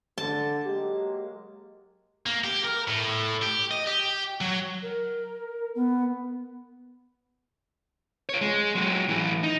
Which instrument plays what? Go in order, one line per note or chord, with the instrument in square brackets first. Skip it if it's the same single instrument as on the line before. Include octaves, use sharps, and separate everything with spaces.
[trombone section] D3 [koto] A5
[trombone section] F#3 G#3 A#3 [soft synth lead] G4
[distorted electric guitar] A#3
G4
A#4
A2
G4
D#5
G4
F#3
[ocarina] A#4
B3
[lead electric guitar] F4 C#5
G#3
F#3 G#3
A2 E3
D#4